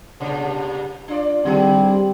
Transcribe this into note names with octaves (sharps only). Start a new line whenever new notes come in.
G2 A#2 C#3
D4 F4 D5
D3 G3 G#3 C4 G4